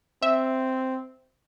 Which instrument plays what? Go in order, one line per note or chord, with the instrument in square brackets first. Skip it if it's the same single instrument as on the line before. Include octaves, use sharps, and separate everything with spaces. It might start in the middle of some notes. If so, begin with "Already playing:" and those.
[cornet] C4 [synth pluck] E5